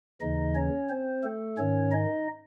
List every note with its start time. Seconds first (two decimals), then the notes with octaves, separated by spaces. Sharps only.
0.21 D#2 C#3 E3 D#4 D#5
0.55 C#4 C#5
0.89 C4 C5
1.23 A3 A4
1.57 G#2 D#3 C#4 C#5
1.92 D#4 D#5